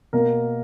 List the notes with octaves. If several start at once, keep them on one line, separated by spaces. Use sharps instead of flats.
B2 A#3 A#4